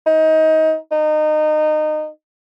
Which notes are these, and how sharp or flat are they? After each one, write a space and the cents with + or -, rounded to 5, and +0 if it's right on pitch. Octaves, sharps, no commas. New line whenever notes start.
D#4 +25
D#4 -25